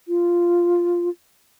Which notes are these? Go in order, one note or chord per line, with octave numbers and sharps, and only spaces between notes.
F4